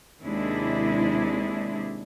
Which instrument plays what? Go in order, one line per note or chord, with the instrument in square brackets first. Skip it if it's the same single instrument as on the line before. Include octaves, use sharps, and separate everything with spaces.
[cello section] D#2 C3 G#3 D4 E4